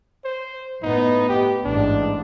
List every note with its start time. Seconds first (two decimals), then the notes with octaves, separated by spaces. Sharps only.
0.24 C5
0.82 A2 B3 D#4
1.28 G4
1.64 A1 G#2 D4